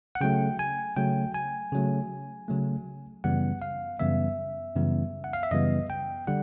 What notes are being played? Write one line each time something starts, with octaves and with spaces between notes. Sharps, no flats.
F#5
C#3 F#3 A3 G5
G#5
C#3 F#3 A3 G5
G#5
C#3 F#3 A3
C#3 F#3 A3
F#2 C#3 E3 G3 B3 F#5
F5
F#2 C#3 E3 G3 B3 E5
F#2 C#3 E3 G3 B3
F#5
F5
E5
F#2 C#3 E3 G3 B3 D#5
G5
D3 G3 F#5